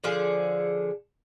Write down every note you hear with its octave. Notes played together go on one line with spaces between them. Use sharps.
D3 F3 G#4